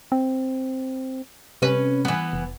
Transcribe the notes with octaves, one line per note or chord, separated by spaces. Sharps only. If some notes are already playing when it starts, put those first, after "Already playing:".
C4
C3 C#4 B4
E3 B3
F1